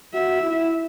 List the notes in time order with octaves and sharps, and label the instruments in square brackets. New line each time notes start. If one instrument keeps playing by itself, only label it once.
[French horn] F#4 [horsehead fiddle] E5
[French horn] E4